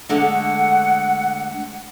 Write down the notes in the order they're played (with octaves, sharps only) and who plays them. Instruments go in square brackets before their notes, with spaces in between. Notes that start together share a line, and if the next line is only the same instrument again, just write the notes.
[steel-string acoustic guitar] D3 G#3 A3 [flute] F#5